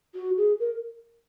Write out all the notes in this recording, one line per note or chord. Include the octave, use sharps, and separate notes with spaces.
F#4
G#4
A#4